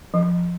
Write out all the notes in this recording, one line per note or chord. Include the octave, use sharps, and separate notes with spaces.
F3